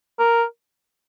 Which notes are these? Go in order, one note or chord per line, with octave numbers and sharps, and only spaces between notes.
A#4